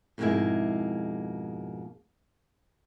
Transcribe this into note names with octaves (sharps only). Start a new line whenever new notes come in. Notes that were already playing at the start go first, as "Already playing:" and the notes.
F2 G#2 B2 G#3 A#3 E4